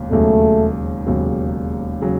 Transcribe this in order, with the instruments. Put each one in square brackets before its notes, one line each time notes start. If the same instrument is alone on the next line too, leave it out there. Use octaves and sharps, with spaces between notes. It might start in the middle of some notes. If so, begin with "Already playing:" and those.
Already playing: [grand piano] E1 D#2 C#3
[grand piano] E1 D#2 C#3 F#3 [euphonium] A3
[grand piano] E1 D#2 C#3 F#3
C#3 F#3